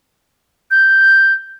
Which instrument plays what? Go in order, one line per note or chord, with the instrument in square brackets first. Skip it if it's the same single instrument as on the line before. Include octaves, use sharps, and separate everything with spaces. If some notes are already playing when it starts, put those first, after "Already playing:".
[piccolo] G6